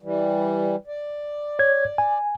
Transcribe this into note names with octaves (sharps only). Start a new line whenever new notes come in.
E3 G3
D5
C#5 G#6
G#5